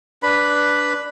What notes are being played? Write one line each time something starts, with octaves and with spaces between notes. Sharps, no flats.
D4 B4 B5